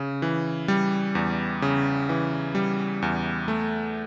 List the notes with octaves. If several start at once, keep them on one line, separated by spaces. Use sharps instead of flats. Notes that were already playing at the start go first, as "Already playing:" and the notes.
Already playing: C#3
E3
G3
E2
C#3
E3
G3
E2
A3